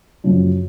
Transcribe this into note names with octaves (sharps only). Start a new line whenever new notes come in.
F#2 C#3 F3